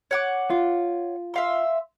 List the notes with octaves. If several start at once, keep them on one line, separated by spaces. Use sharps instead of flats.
C#5 F#5 D6
F4
E5 F5 C6